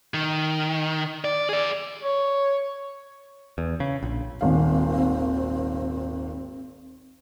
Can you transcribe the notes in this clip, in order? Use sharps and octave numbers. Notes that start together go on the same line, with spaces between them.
D#3
D5
G#4 D5
C#5
E2
C#3
A#1
D#1 G#1 C4 F5